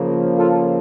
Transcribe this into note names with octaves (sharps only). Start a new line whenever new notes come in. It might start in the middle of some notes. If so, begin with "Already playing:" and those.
Already playing: C#3 F3 A#3
F4 A4